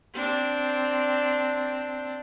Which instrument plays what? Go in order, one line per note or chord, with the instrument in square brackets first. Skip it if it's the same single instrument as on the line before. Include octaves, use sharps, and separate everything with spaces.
[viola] C4 D4